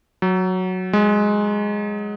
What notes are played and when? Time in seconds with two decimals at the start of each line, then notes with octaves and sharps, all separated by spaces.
0.22 F#3
0.93 G#3